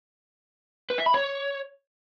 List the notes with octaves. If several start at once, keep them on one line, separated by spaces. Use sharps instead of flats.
B4
E5
B5
C#5